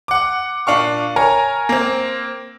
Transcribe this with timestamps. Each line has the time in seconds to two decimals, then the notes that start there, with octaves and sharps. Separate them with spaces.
0.08 F#5 D6
0.67 A#2 D4 F5 C#6
1.16 A#4 C#5 G#5 A#5
1.69 A#3 C4